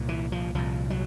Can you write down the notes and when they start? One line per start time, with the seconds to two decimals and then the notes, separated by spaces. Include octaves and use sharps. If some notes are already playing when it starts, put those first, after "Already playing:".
Already playing: C2 A#2
0.09 E3
0.32 F3
0.55 C2 A#2 F3
0.90 F#3